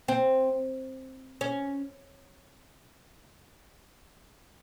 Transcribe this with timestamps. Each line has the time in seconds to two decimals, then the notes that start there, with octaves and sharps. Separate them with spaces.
0.08 C4
1.41 C#4